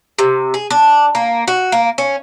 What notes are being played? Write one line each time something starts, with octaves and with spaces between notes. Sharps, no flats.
C3
G#4
D4
A#3
F#4
A#3
C#4